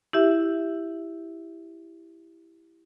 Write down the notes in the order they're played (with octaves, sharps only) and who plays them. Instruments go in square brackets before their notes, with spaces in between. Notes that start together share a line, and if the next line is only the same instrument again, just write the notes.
[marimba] E4 G4 E5